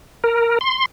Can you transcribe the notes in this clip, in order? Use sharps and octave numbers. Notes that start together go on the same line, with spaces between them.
A#4
C6